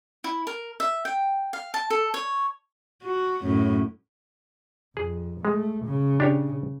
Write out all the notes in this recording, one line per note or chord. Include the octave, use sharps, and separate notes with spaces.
E4
A#4
E5
G5
F5
A5
A4
C#5
F#4
F#2 A2
F2 G#4
G#3 A3
C#3
D4 G4 C#5